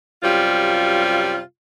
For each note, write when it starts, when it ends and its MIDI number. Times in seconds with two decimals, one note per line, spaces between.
0.23 1.39 42
0.23 1.39 48
0.23 1.39 55
0.23 1.39 65